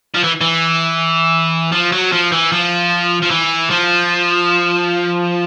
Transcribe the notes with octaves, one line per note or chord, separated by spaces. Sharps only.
F3
E3
E3
F3
F#3
F3
E3
F3
F3
E3
F3